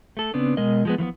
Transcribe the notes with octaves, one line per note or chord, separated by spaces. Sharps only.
A3 A4
C#3 B3 C4 D4
B2 G#3 A#4 D#5
F3 G#3 B3
E3 F3 A3 B3